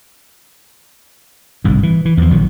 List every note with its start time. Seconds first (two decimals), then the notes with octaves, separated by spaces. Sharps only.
1.64 G1 C2 G#2
1.83 E3
2.05 E3
2.17 E2 F3
2.30 A#1 D#3 F#3